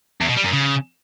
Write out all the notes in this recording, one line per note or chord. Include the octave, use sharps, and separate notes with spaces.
E2
B2
G3
F#2
C#3